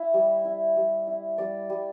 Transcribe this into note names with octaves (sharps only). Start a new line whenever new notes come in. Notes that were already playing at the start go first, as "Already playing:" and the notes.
Already playing: E4 E5
G3
E4
G3
E4
G3 D5
G3